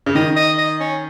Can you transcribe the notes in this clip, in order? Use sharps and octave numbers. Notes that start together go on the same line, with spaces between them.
C#3
D#3 D#5
D#5
D#5
C#4